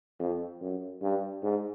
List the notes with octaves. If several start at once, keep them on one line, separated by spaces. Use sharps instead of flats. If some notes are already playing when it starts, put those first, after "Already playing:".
F2
F#2
G2
G#2